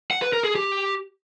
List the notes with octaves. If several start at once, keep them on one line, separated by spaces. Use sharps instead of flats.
F#5
B4
A#4
G#4
G4